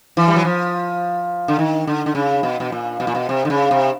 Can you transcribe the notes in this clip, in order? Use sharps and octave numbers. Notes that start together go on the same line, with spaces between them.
E3
G3
F#3
F3
D3
D#3
D3
D3
C#3
B2
B2
A#2
B2
A#2
B2
C3
D3
C#3
C3